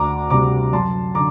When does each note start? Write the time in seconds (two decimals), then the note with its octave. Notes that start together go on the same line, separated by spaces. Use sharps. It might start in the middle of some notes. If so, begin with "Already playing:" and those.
Already playing: D2 A#5 D6
0.30 C3 G3 A#5 D6
0.73 F#2 A5 C6
1.15 D3 A#5 D6